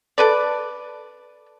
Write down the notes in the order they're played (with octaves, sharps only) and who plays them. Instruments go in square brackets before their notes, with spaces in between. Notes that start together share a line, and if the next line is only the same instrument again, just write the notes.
[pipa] A4 B4 D5